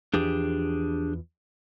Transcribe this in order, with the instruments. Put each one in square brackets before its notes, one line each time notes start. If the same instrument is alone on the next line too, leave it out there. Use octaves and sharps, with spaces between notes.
[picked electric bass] E2 E3 F3 [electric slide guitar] D4 G4 G#4